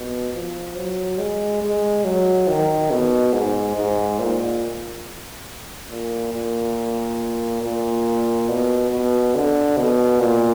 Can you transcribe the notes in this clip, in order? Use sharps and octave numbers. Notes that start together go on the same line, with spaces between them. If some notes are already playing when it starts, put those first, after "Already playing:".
Already playing: B2
F3
F#3
G#3
G#3
F#3
D#3
B2
G#2
G#2
A#2
A#2
A#2
A#2
B2
B2
D3
B2
A#2